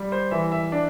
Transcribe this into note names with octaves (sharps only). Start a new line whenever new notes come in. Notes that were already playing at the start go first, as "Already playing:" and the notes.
Already playing: G3
C5
E3 E5
E5
D4